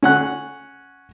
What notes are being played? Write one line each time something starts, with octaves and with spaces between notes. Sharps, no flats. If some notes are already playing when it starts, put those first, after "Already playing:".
C#4 F#5 F#6